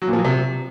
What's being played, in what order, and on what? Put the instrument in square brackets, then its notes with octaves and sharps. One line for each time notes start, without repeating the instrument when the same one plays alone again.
[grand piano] F#3
A#2
F3
F#3
C3